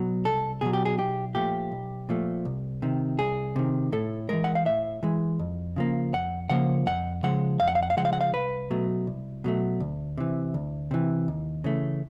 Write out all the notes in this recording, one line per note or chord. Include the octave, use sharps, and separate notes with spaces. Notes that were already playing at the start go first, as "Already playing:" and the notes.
Already playing: B2 F#3
C2 A4
B2 F#3 G#4
G4
G#4
B1 G4
A#2 F3 A3 G4
B1
A#2 F3 A3
C2
C3 D#3
C2 G#4
C3 D#3
A2 A4
E3 G#3 A#4
F#5
F5
A2 E5
E3 G#3
F2
C#3 F3 A#3
F2 F#5
C#3 F3 A#3 F#5
F2 F#5
C#3 F3 G#3 F#5
F2 F5
F#5
F5
F#5
F5
C#3 F3 G#3 F#5
F5
F#5
F5
C2 B4
B2 F#3 A3
C2
B2 F#3 A3
D2
C3 E3
D2
C3 E3
D#2
C#3 E3 A3